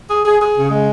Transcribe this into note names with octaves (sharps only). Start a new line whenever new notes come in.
G#4
G#4
G#4
C#3
G#3